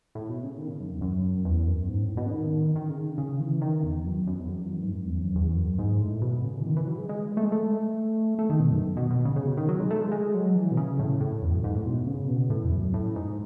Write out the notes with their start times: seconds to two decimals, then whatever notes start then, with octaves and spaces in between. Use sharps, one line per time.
0.15 A2
0.29 B2
0.44 C#3
0.58 D#3
0.69 C#3
0.80 F#2
0.91 E2
1.01 F#2
1.45 E2
1.67 F#2
1.89 G#2
2.03 A2
2.17 B2
2.26 C#3
2.31 D#3
2.76 D#3
2.90 C#3
3.18 C#3
3.40 E3
3.61 D#3
3.83 E2
4.06 F#2
4.27 F#2
4.40 E2
4.48 F#2
4.60 E2
4.70 F#2
4.81 G#2
4.91 F#2
5.06 E2
5.21 F#2
5.35 E2
5.56 F#2
5.79 G#2
6.00 A2
6.22 B2
6.44 C#3
6.61 E3
6.66 D#3
6.76 E3
6.86 F#3
6.98 G#3
7.09 G#3
7.37 A3
7.44 G#3
7.52 A3
8.39 A3
8.50 D#3
8.60 B2
8.71 F#2
8.97 B2
9.10 B2
9.25 C#3
9.36 C#3
9.47 B2
9.57 D#3
9.69 F#3
9.80 G#3
9.90 A3
10.01 G#3
10.11 G#3
10.34 F#3
10.55 E3
10.71 B2
10.77 C#3
10.99 A2
11.20 A2
11.42 E2
11.53 F#2
11.64 G#2
11.75 A2
11.86 B2
12.07 C#3
12.28 B2
12.50 A2
12.64 E2
12.72 F#2
12.94 A2
13.15 G#2